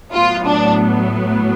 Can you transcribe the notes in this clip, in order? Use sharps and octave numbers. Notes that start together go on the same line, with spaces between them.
A2 F#3 B3 F4
D4